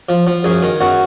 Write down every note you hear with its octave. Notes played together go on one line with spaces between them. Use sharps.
F3
F3
F#2 G#4
D#3
F#2 F#4